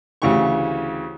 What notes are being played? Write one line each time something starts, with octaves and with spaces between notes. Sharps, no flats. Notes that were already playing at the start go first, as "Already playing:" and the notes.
D2 C#3 E3 G4 C#6